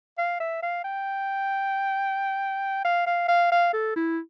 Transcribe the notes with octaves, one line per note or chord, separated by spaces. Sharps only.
F5
E5
F5
G5
F5
F5
F5
F5
A4
E4